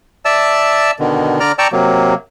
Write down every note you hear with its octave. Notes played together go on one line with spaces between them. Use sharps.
D5 E5 A5 E6
B2 D3 D#3
D3 D5 A#5 F6
D5 G5 A5 A#5 C#6 E6
C3 F#3 A#3